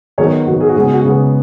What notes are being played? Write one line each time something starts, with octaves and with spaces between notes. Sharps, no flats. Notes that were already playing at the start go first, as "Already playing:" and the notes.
D#3 F#3 B3 G#4 C#5
D#3 F#3 B3 F#4
G#4
F#4
C#3 G#3 B3 G#4
F#4
C#3 G#3 B3 G#4